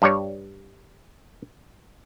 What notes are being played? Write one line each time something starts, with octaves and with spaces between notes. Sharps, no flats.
G2 G3 C#5